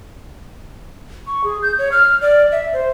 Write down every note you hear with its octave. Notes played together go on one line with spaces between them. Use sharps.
C#6
G#4
G6
C#5
F6
D5
E5
C5